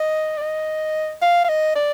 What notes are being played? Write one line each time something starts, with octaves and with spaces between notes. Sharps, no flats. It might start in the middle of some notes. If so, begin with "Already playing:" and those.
Already playing: D#5
D5
D#5
F5
F5
D#5
D5